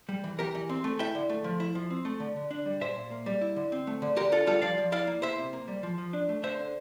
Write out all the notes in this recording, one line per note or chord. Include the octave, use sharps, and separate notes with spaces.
G3
E3
E3 G4 A#4
E3
C4
A3
E4 E5 G5
D3
A3
F3
E4
F3
C4
A3
D3
D3
D4
G3
A#2 C5 E5
A#2
A#3
G3
E4
D3
C4
A3
D3
D3 G4 A#4
D4 F4 A4
G3 F4 A4
F3 D5 F5
F3
E4 D5 F5
A#3
E4 C5 E5
C3
A#3
G3
F3
F3
D4
A3
D3 C5 E5
D3